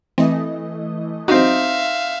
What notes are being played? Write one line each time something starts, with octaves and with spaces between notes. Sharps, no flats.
E3 A3 C4 D#5
C4 D#4 F#4 E5 F5 D#6 C7